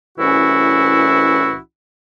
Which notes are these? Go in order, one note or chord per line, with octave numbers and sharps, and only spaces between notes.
C2 A2 E3 C#4 E4 F#4